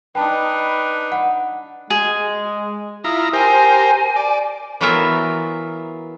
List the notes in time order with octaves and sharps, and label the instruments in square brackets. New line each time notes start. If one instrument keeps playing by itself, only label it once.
[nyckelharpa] D4 D#4 [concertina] B4 [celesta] G5 A5
[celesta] F#5
[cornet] G#3 [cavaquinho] G#4
[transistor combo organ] E4 F4 A#5 [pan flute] D#6
[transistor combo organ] G4 A#4 C5 [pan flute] G#5
[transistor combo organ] D5
[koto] E3 F#3 B3 F4 A#4 E5